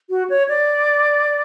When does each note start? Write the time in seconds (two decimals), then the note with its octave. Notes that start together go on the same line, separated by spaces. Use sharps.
0.10 F#4
0.30 C#5
0.49 D5